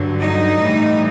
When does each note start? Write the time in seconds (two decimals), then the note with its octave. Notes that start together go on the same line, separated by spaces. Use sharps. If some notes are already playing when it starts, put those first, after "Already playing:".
Already playing: G2 D3 F#3
0.21 D#4
0.58 A2 E3 G3